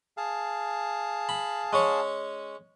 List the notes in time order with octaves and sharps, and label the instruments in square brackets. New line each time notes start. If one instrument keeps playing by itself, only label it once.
[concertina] G#4 F5 A5
[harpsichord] B5
G#3 C#4 C#5